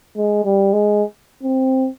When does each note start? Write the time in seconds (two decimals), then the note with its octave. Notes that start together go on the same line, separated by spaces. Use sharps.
0.17 G#3
0.45 G3
0.73 G#3
1.43 C4